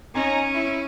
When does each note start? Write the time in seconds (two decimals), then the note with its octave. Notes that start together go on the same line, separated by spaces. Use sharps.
0.14 C#4 D#4 G#5 A#5
0.54 E4